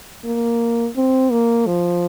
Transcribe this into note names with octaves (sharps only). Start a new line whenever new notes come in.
A#3
C4
A#3
F3